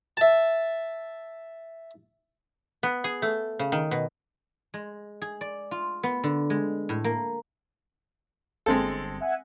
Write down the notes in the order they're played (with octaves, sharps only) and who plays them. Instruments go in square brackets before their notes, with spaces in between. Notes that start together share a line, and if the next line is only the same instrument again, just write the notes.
[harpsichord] E5 A5
[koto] B3
G#4
A3
C#3
D#3
B2
[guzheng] G#3
G#4
D5
F4
B3
D3
G#3
A2
A#3
[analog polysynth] G1 [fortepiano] G#3 C4 A4
[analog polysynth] E5 F#5 G#5